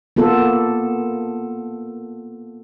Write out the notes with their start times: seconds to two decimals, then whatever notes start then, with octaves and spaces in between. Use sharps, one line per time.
0.16 A#3 B3 F4 A4